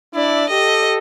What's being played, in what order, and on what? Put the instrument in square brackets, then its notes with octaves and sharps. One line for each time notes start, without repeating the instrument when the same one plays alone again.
[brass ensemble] D4 E4 [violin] D5
[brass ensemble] G4 A4 [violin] D#5